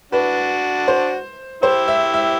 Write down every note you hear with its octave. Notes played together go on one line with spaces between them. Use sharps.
D4 F#4 B4
C5
E4 G4 C5
E5
E5